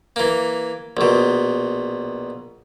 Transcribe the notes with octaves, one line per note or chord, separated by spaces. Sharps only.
E3 A#3
A#1 B2